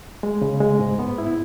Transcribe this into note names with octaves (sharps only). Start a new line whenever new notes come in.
G#3
C#3
G#3
G#2
B3
E4